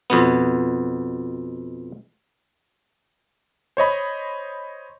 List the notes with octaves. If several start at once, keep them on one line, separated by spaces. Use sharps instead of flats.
F2 B2 B3
C5 C#5 D#5 B5